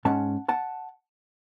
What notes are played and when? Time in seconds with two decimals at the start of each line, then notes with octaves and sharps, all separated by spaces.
0.05 G#2 G#3 C#4 F#5 A5
0.48 F#5 A5